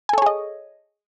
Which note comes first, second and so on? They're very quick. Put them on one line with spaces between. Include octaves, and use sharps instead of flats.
G#5 A4 C#5 G#4 D#5